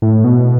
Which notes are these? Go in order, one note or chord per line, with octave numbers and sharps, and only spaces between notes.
A2
B2